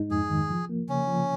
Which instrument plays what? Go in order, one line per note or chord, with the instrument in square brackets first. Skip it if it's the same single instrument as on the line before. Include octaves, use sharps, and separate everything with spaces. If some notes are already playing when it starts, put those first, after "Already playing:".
Already playing: [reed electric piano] G#2 G#3 D#4
[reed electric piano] F2 [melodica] G#4
[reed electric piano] D#3
F3
A#3
[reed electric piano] C#3 [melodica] C#4
[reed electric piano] F3